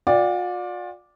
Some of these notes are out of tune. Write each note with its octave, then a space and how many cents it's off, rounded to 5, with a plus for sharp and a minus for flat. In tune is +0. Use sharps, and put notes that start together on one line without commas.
F4 +45 D5 +0 G5 +15